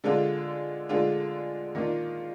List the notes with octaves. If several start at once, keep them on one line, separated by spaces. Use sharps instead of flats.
D3 G#3 D4 F4
D3 G#3 D4 F4
D#3 A#3 D4 F4